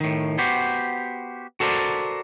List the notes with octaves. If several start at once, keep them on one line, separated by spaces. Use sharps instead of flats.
A2 D#3
B3 F#4 G4 C5
F#4 A4 A#4 C5 D5